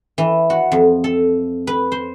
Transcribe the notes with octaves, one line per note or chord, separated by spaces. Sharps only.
E3
F#4
F2
A4
B4
C5